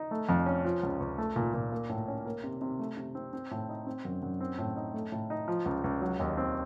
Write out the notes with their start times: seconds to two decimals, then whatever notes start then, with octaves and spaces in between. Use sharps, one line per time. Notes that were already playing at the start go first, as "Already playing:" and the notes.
Already playing: D#4
0.11 A3
0.29 F2
0.46 C#4
0.65 F3
0.83 C#2
1.00 C#2
1.18 A3
1.36 A#2
1.54 A#2
1.72 A#3
1.90 A2
2.08 C#4
2.25 A#3
2.44 C3
2.61 C3
2.79 A3
2.97 C3
3.15 C4
3.33 C4
3.51 A2
3.69 D#4
3.87 C4
4.05 F#2
4.22 F#2
4.40 C4
4.58 A2
4.76 D#4
4.94 A3
5.12 A2
5.30 D#4
5.48 F3
5.66 C#2
5.84 C#2
6.01 F#3
6.19 D#2
6.37 C4